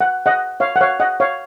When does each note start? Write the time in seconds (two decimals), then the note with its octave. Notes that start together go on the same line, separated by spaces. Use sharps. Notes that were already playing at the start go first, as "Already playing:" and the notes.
0.01 F#5
0.26 D#5 F#5
0.60 C#5 F5
0.76 F#5
0.81 C#5 F5
1.00 D#5 F#5
1.20 C#5 F5